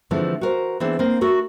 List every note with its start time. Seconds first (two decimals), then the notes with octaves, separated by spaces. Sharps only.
0.11 D3 E3 F3 G#3 A3 C4
0.41 F#4 A#4 C5
0.80 E3 B3 C4 D4 G#4
0.99 A#3 C4
1.21 A3 F#4 A4 A#4